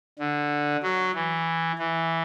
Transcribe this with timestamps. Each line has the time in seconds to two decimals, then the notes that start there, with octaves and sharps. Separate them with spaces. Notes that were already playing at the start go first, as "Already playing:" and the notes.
0.19 D3
0.83 F#3
1.14 E3
1.78 E3